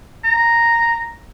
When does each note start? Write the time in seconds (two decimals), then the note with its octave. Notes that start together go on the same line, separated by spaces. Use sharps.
0.24 A#5